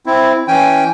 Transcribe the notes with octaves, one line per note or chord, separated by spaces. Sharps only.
C4 E4
E3 C#4 G5 G#5